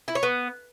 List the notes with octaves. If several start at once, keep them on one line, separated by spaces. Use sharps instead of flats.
E4
C#5
B3